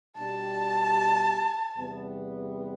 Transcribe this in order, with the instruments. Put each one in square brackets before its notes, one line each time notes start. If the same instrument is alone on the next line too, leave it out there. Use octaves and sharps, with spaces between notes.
[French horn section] B2 G3 D4 G4 [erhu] A5
[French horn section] E2 C3 G3 B3